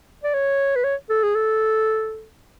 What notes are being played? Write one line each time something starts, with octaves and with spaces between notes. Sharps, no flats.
D5
C#5
B4
C#5
A4
G#4
A4